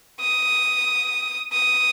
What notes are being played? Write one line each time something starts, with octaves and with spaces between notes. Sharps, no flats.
D#6
D#6